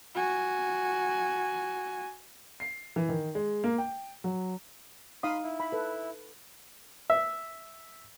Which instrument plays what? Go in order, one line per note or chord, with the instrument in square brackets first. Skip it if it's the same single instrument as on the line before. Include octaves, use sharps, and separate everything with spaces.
[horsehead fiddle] F#4 G#5
[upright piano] C7
E3
D#3
G#3
A#3
G5
F#3
[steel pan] D#4 F5 D#6 [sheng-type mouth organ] B5 C6
[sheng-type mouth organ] E4
[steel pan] B5
A4 B4
[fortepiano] E5